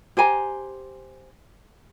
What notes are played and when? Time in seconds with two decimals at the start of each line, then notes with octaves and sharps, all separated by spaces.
0.17 G4 C5 G#5 A#5